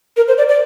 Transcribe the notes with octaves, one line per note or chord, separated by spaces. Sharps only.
A#4
C5
D5
D5